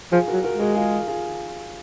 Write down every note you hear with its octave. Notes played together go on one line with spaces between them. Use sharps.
F3 F4 G#4
F#4 A#4
F#3
F#4 A#4
G#3
F#4 A#4
F4 G#4
F4 G#4